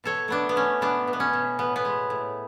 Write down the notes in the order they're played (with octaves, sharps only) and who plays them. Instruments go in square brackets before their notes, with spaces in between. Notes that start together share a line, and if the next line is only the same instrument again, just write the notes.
[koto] B2 A4 C#5
A3 B3 D4
B3
A3 C#4
B2 B3 D4
B2
B3
C#4
B2
A2 B3
B3
G#3
A2